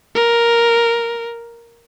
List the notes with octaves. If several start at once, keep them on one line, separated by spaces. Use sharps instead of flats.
A#4